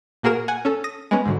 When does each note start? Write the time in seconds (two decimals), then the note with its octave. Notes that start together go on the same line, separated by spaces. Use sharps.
0.23 A#2 A#3 F#4 G#4 A#4 E7
0.48 F#5 G#5
0.65 C#4 A4
0.84 D#6 A#6
1.11 G#3 B3 C#4
1.26 G#2 D3 F#3